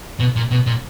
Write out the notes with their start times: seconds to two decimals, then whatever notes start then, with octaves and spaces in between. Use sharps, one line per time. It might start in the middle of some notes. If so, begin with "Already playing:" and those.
0.19 B2
0.36 A#2
0.51 B2
0.66 A#2